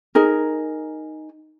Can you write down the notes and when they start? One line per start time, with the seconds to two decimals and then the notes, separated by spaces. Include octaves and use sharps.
0.15 D#4 G#4 A#4